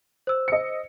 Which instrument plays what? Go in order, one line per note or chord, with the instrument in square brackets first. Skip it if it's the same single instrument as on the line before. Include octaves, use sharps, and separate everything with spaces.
[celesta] C5 E6
[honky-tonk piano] D#5 C#7